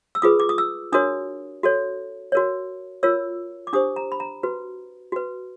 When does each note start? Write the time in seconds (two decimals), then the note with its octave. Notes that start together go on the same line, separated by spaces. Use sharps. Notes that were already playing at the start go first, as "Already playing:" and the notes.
0.15 E6
0.22 F4 G#4 B4 D#6
0.40 D6
0.49 D#6
0.58 E6
0.92 D4 F#4 A#4 C#5 D#6
1.63 F#4 A4 C#5
2.32 F#4 A#4 C#5
3.03 F4 A#4 C#5 E6
3.67 D6
3.73 D4 G4 C5 D#6
3.96 A#5
4.12 B5
4.20 A#5
4.43 F#4 B4
5.12 F#4 B4